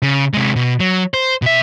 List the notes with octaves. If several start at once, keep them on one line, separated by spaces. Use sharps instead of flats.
C#3
C3 G#3
B2
F#3
C5
B2 E5